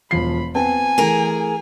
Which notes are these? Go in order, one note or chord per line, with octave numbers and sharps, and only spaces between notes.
E1 F3 B5 C7
B3 C4 G#5 A5
E3 A3 G#4 A#4